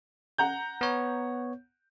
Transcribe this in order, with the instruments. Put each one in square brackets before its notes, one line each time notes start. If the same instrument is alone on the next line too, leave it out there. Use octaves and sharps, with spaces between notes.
[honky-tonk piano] F#5 A#5 G6
[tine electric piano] B3 C#5